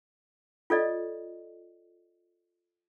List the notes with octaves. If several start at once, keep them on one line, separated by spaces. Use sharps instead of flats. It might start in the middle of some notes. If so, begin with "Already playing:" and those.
F4 A4 D5 D#5